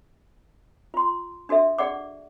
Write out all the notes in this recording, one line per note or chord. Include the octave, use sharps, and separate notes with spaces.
F4 C6
D4 F#4 A4 E5
G#4 D5 F#5 D6